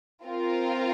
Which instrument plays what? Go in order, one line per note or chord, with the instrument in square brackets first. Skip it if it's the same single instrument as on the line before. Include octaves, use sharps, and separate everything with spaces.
[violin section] C4 F4 A#4